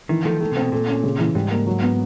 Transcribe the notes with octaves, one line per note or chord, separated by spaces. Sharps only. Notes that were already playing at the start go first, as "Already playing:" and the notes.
D#3 E3
D#3 F3 A3
D#3 A3
C3
C4
B2
A#2 A3
C#4
C#3
E3
G#2 G3
A#3
F#3
B3